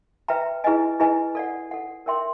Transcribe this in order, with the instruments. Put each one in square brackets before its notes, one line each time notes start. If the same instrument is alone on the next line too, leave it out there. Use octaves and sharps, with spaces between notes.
[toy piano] B4 E5 G5 A#5
E4 G#4 B4 D#5 G#5
E4 G#4 B4 D#5 G#5
A4 D5 F#5
A4 D5 F#5
A#4 C#5 E5 G5 C6